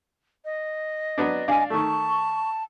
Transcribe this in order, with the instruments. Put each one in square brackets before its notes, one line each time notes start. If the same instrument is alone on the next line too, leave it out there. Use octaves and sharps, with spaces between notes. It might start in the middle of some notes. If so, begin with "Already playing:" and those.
[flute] D#5
[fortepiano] F#3 B3 D4
[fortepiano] D4 D5 F5 [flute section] G#5
[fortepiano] D#3 A3 [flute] A5 [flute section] C#6